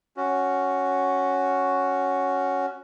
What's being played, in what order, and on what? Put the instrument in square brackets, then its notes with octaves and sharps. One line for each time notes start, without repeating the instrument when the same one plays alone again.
[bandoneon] C#4 F#4